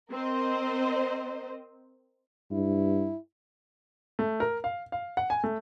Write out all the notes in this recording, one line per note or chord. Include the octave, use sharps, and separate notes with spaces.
C4 A#4 C5 D#5
G2 E4
A3
A#4
F5
F5
F#5
G#5
A3